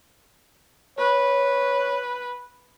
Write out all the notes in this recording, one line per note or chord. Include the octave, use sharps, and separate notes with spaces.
B4 C#5